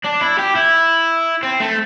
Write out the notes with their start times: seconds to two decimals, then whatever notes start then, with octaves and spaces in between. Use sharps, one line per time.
0.04 D4
0.21 E4
0.39 G4
0.56 E4
1.43 C4
1.61 A3